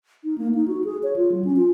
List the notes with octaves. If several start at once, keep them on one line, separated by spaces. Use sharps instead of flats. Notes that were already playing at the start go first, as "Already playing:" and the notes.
D#4
A#3
D#4
F#4
G#4
C#5
F4
F#3
C#4
F4